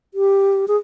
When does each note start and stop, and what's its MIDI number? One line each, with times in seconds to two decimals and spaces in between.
0.14 0.66 67
0.68 0.77 68